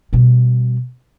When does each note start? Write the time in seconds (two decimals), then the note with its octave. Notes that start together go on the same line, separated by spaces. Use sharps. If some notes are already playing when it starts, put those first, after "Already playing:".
0.13 B2 G3